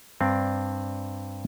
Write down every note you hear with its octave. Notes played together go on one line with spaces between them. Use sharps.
G2 C4 D4